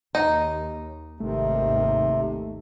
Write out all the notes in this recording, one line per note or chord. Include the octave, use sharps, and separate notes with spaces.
D#2 D#4
G#1 D#2 C3 D#3 A3